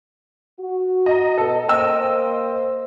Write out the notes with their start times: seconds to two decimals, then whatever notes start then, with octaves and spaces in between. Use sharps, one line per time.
0.60 F#4
1.06 D#5 A#5
1.38 B2 A4 B4 D#5
1.69 A#3 C5 D#5 G5 E6